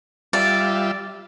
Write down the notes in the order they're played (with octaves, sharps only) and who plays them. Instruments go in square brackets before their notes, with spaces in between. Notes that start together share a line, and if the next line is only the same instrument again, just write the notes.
[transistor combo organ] G3 F4 E5 [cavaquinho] D5